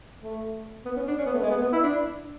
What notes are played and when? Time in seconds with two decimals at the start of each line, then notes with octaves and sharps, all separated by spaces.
0.21 A3
0.85 B3
0.97 C#4
1.08 D4
1.18 C#4
1.26 B3
1.34 A3
1.42 G#3
1.51 B3
1.62 B3
1.73 E4
1.83 D4